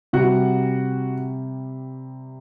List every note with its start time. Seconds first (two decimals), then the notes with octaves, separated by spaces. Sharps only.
0.13 C3 G3 F#4 F#5